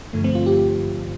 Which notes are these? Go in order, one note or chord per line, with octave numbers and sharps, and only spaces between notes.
G2 D3 F3 A3
C4
F4
G4